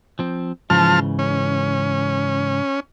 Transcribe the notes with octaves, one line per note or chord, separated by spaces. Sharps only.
F3 C4
G#2 C#3 E3 F3 A5 F6
C#4